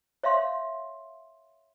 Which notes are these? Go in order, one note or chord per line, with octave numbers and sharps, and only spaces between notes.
C#5 E5 F5 C6